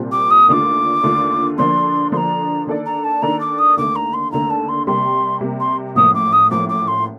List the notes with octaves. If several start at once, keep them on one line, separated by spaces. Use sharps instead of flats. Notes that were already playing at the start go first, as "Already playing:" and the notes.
Already playing: C2 A#2 G3 C4 F4
D6
D#6
D#2 D3 A3 D4 F4 D6 D#6
D#2 D3 A3 D4 F4
D3 F3 A#3 D4 C6
D3 F3 A#3 D4 A#5 C6
D#3 A#3 D4 A4 D5
A#5
A5
D#3 A#3 D4 A4 D5 A#5
D6
D#6
D#2 D3 A3 D6
A#5
C6
D#2 D3 A3 A#5
A5
C6
C3 G3 A#3 C6
C3 G3 A#3
C6
A1 A2 F3 A#3 D#6
D6
D#6
A1 A2 F3 A#3 D6
D6
C6